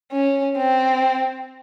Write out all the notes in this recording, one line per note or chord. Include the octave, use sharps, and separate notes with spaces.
C#4
C4